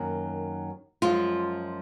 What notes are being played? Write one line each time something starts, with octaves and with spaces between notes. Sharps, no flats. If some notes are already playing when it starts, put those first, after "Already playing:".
Already playing: F#2 D#3 F#3 A#3
F#2 F3 G#3 F4